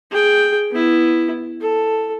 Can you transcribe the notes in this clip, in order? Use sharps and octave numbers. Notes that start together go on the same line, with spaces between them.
G#4 G5
B3 E4
A4